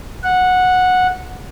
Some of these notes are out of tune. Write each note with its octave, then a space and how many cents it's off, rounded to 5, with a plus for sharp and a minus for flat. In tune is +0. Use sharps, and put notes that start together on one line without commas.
F#5 -10